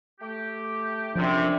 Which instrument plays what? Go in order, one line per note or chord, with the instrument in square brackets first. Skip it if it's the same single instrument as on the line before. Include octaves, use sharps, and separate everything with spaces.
[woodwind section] A3 G4
[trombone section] F#2 C3 [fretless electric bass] F3 [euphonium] D4